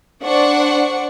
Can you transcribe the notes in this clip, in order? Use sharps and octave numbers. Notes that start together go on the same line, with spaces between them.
D4 C5 D5 F#5 C#6